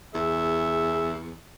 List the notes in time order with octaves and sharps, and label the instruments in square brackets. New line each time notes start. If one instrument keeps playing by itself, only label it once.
[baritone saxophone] E2 [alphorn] G#4 [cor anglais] E5